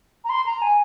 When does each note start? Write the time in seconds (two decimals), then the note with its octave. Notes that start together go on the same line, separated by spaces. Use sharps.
0.24 A#5
0.29 C6
0.46 A#5
0.61 G#5